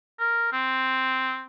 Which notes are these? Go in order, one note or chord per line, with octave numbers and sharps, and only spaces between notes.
A#4
C4